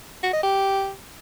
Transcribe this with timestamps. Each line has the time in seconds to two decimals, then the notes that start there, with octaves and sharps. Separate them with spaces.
0.23 F#4
0.33 D#5
0.43 G4